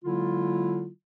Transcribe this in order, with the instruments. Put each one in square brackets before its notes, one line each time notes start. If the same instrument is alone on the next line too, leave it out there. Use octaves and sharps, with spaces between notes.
[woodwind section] D3 F#3 G#3 A#3 E4 F4